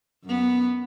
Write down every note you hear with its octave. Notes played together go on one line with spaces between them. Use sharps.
F#2 B3